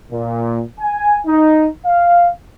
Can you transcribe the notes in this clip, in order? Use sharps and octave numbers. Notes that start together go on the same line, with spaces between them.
A#2
G#5
D#4
F5